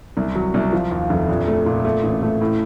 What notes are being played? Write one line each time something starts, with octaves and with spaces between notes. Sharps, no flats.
C2
F#3
C2
F3
D#2
F1
A#1
A3
A#2
A3
A1
A3
A2